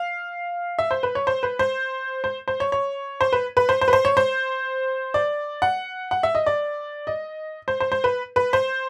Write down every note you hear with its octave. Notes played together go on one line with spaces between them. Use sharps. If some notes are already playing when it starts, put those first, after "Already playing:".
Already playing: F5
E5
C5
B4
C#5
C5
B4
C5
C5
C5
C#5
C#5
C5
B4
B4
C5
C5
B4
C5
C#5
C5
D5
F#5
F#5
E5
D#5
D5
D#5
C5
C5
C5
B4
B4
C5